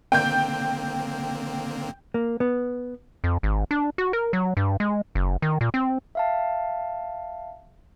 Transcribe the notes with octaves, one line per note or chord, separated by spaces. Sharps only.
D3 A#3 C4 G5 G6
A#3
B3
F2
G#1
D4
F#4
A#4
F#3
G2
G#3
F#1
D#3
A#2
C4
E5 F5 A5